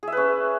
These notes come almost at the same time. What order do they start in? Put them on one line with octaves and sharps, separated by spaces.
G#4 E5 B4 C#4